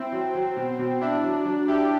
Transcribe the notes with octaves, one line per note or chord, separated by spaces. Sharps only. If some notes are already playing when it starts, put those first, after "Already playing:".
Already playing: C4 E4
F#3
F#3
B2
B2
D4 E4
F#3
F#3
E4 G4